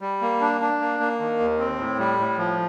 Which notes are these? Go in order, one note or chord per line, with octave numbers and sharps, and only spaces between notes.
G3
A#3
D4
D4
A#3
A#3
D#3
D#2
C4
A2
G3
A2
F3